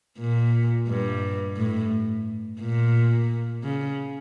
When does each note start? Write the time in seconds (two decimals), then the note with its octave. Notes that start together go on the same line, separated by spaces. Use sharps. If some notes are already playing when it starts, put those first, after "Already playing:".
0.19 A#2
0.88 G2
1.56 A2
2.60 A#2
3.63 C#3